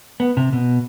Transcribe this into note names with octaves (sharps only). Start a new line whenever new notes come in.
B3
C3
B2